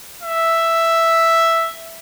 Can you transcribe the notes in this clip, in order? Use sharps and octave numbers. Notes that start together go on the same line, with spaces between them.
E5